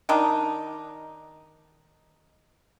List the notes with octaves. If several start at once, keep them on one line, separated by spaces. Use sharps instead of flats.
D#3 D4 D#4